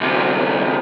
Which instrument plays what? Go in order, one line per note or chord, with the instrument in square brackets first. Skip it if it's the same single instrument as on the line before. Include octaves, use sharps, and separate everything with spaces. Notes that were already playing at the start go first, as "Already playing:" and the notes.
[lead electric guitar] D2 C3